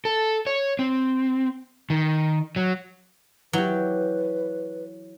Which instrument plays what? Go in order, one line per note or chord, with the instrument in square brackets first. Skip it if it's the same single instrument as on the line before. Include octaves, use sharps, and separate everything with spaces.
[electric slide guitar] A4
C#5
C4
D#3
F#3
[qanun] E3 G4 [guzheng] F#3 [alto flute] B4